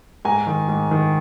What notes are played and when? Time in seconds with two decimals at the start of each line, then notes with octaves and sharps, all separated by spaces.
0.25 G#2 G#5 A#5
0.47 D#3
0.68 G#2
0.91 D#3